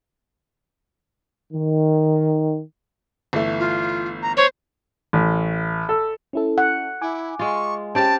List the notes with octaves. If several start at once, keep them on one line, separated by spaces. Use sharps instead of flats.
D#3
G1 E3 A3
F4
A#5
C5 C#5
A1
A4
C#4 E4 A4
F#5
E4 G#5 D6
G#3 F4 C#6
C4 C#4 G4 F5 A5